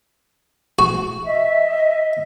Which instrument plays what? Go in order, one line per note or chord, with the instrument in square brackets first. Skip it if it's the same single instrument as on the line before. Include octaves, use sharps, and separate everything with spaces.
[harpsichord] F#4
[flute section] D#5 E5